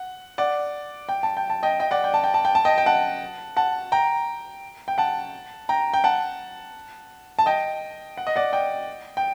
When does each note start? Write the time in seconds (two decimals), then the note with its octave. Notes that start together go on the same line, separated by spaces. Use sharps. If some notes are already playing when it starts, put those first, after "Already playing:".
Already playing: F#5
0.38 D5 F#5
1.09 G5
1.23 A5
1.37 G5
1.50 A5
1.63 D#5 G5
1.80 D#5 G5
1.91 D5 F#5
2.04 G5
2.14 A5
2.24 G5
2.34 A5
2.45 G5
2.55 A5
2.65 D#5 G5
2.78 G5
2.86 F#5 A5
3.57 F#5 A5
3.92 G5 A#5
4.88 G5
4.98 F#5 A5
5.69 G5 A#5
5.93 G5
6.04 F#5 A5
7.39 A5
7.46 D#5 G5
8.17 F#5
8.27 D#5
8.36 D5 F#5
8.53 D#5 G5
9.17 G5